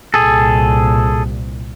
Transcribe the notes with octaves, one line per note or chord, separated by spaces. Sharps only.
C2 A#2 G#4 A4